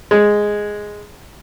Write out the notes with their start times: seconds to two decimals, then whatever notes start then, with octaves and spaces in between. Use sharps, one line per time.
0.11 G#3